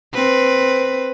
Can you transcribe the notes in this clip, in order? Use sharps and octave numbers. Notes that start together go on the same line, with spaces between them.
C4 B4